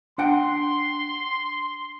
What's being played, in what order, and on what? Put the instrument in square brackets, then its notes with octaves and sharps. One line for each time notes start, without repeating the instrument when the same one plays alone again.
[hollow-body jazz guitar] D4 F#5 G5 [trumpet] C6